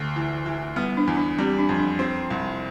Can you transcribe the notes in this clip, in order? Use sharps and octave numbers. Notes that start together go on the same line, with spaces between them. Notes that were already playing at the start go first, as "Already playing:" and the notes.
Already playing: D2
E3
E3
G3 B3
D4
E2
D4
G3 C4
D4
F2
D4
C4
C2